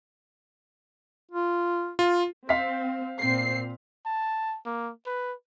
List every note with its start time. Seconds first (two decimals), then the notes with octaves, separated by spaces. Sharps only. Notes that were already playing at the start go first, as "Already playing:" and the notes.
1.31 F4
1.99 F4
2.49 C4 F5 B6
3.21 A#2 C4 C7
4.06 A5
4.66 A#3
5.06 B4